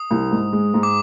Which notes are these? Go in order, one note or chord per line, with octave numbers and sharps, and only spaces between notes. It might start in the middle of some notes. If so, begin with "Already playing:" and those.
Already playing: D#6
C2
G#2
G#3
G#2
D6